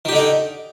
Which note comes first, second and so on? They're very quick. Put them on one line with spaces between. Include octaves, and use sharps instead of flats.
D#3 G4 D3 D#4